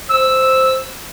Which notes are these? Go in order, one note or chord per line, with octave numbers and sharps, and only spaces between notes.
C5 E6